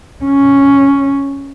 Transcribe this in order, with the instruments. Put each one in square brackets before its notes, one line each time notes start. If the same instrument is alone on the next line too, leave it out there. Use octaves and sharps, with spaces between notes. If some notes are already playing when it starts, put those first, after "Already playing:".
[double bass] C#4